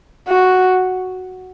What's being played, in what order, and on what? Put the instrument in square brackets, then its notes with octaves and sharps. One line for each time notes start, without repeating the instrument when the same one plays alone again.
[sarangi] F#4